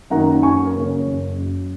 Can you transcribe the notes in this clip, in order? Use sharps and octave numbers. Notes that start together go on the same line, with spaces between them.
F#2 D#3 A#3 D#4 F#5 A#5
F#2 G#5 C#6
A#4
C#3 A#3 C#4
C#5
F#1
F#2 F#3